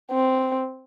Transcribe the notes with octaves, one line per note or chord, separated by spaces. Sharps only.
C4